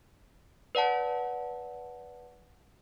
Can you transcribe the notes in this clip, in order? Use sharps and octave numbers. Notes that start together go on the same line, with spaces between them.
B4 D5 F#5 A5